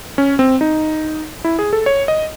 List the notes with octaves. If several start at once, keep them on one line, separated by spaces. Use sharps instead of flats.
C#4
C4
D#4
E4
G#4
A4
C#5
D#5